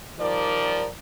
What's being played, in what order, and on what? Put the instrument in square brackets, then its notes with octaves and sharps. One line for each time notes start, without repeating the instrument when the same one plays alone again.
[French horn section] D#3 F3 G3 A#4 D5